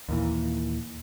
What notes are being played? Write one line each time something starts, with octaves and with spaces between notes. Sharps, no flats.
D#2 A#2 E3